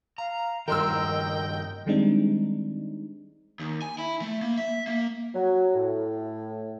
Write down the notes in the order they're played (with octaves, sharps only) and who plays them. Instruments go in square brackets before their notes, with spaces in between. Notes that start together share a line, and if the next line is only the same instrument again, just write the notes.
[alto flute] F5 [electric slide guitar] A#5
[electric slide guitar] G2 D#3 [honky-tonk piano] A#4 C6 E6 [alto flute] D#5 [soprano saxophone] G5
[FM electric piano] D#3 G3 G#3 C4 D4 D#4
[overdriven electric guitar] D#2
G#5
E4
A3
A#3
E5
A#3
[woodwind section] F#3
A2